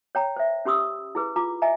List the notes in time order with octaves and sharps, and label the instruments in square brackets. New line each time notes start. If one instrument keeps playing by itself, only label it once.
[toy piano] C#5 G5 A#5
C5 E5
C#4 G4 B5 C#6 D#6 E6
E4 G#4 B4
F4 A#5 D6
D#5 E5 G#5 A#5